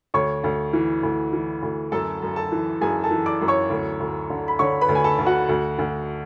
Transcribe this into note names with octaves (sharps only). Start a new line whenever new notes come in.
D2 C#5 C#6
D2
E3
D2
E3
D2
F#2 A4 A5
F#2
A4 A5
E3
F#2 G#4 G#5
A4 A5
E3
D5 D6
F#2
C#5 C#6
D2
D2
D3
B5
D3 C#5 C#6
B4 B5
D2
G#5
A4 A5
D2
F#4 F#5
D2
D2